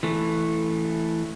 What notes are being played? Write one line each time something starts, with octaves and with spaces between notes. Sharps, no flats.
E3 A3